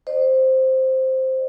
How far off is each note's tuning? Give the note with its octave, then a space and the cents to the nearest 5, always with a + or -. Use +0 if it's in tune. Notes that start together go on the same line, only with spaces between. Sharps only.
C5 +0 D#5 -45